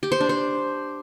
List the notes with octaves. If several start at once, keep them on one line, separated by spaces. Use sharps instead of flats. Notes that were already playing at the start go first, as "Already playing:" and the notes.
G4
C5
D4
C5